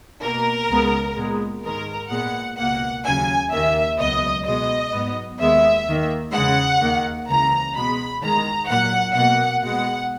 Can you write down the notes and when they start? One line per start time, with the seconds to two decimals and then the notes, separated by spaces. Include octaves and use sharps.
0.22 B2 A#3 A#4
0.69 C#2 C#3 G#3 B3
1.16 A#2 G#3 B3
1.64 G#2 D#3 G#3 A#4
2.10 A#2 G#3 B3 F#5
2.58 C#2 B2 A#3 F#5
3.05 D#2 C#3 F#3 G#5
3.52 D#2 D#3 A#3 E5
3.98 C#2 B2 F#3 B3 D#5
4.46 B2 G#3 B3 D#5
4.92 G#2 F#3 B3
5.40 D#2 D#3 G#3 B3 E5
5.87 D#2 D#3 A#3
6.33 E2 C#3 G#3 F#5
6.81 D#2 D#3 A#3
7.28 C#2 C#3 E3 A#5
7.75 B2 G#3 B3 B5
8.22 E2 D#3 G#3 A#5
8.69 A#2 F#3 A#3 F#5
9.16 B2 A#3 F#5
9.64 B2 G#3 B3 F#5